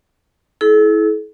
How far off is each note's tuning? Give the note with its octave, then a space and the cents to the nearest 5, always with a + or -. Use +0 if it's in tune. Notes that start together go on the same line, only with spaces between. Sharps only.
E4 -20 A4 -45